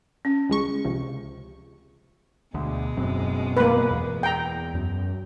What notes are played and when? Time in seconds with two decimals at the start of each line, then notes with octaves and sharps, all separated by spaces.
0.25 C#4
0.49 C#2 G#3 C#6
0.84 C#2 C3 F3
2.54 D2 B2 G#3
2.97 F#1 F#2 C4
3.57 A#3 B4
3.91 E2
4.23 G5 A#5
4.75 F#2